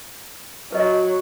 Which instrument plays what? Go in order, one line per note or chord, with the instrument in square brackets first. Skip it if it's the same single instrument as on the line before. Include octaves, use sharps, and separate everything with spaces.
[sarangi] F#3 [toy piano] B4 D#5